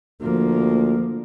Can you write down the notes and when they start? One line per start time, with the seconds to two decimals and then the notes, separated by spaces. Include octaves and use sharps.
0.21 D2 F3 A#3